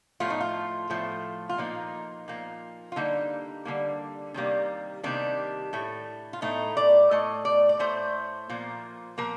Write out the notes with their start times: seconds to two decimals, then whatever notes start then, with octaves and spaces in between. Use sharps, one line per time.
0.20 A2 F3 A3 F4
0.30 D#4
0.40 F4
0.90 A2 F3 A3
1.49 F4
1.58 A#2 F3 A#3 D#4
2.28 A#2 F3 A#3
2.92 F4
2.96 D3 G3 A#3 D#4
3.65 D3 G3 A#3
4.34 C3 D#3 G3 A#3
5.03 C3 D#3 G3 A#3 D4
5.73 A2 A3
6.33 F4
6.42 A2 A3 D#4
6.77 D5
7.11 A2 A3 D#5
7.45 D5
7.69 D5
7.79 A2 A3 C5
8.49 A#2 F3 A#3
9.18 A#2 F3 A#3 A#4